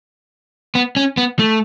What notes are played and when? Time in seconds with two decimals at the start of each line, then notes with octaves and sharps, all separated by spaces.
0.75 B3
0.96 C#4
1.17 B3
1.39 A3